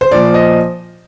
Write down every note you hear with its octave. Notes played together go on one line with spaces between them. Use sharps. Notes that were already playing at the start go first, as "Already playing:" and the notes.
C5
A#2 F3 D5
D#5